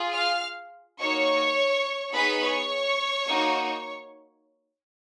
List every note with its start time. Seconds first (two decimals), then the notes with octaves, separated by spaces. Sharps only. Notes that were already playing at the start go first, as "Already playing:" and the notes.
Already playing: F4 G#4
0.13 F5 F6
0.99 A#3 D#4 F#4 C#5 C#6
2.13 B3 D#4 G#4 B4 B5
2.41 C#5 C#6
3.27 A#3 D#4 F#4